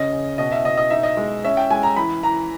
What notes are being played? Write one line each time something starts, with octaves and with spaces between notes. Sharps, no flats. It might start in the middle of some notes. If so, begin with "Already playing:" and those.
Already playing: C#3 C#4 D#5
C#3
B2 D#5
E5
B2 D#5
D#5
D#4 E5
D#5
G#3
C#4 E5
G5
G#3 G#5
A#5
E3 B5
E3 A#5